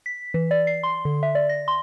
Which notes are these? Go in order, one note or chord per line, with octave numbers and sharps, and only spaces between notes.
B6
E3
D5
C7
C6
D3
E5
D5
A#6
C6